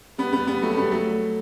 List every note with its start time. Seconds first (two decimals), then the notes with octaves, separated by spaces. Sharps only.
0.18 G3 B3
0.33 G3 B3
0.47 G3 B3
0.62 F#3 A3
0.73 A3
0.77 G3 B3
0.92 F#3 A3